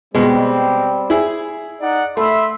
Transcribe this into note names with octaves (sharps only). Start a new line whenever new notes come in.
B2 G3 G#3 C4
E4 G#4
D#4 D5 F#5
A3 E5 B5 C6